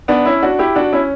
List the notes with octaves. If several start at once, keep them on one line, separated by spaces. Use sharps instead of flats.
B3 D4
C#4 E4
D4 F#4
E4 G4
D4 F#4
C#4 E4